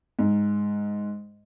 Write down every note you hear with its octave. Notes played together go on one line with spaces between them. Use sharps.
G#2